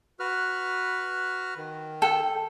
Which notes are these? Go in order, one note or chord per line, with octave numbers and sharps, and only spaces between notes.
F#4 B4 F6
D#3
A4 G5